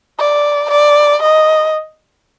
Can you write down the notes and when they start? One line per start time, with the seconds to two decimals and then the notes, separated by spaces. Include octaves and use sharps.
0.19 D5
0.71 D5
1.23 D#5